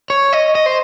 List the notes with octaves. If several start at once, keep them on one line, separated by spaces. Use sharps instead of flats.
C#5
D#5
D#5
C5